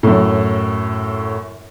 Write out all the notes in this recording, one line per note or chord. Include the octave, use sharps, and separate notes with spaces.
F#2 A2